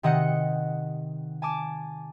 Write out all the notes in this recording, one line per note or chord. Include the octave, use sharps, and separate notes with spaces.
C3 D#3 D#5 F#5 G6 C#7
G#5 A5 D6